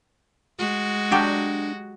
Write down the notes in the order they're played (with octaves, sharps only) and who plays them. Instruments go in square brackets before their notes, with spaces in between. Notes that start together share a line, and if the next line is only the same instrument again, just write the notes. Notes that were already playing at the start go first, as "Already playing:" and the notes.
[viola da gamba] G#3 F#4
[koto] F#3 G4 A4 [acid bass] D4